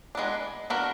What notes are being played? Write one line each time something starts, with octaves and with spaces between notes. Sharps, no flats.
G#3 B3 D4
B3 D4 F#4 A#4